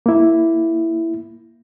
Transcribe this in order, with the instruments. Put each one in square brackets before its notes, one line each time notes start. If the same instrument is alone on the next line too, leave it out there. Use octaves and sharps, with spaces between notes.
[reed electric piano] A#3 E4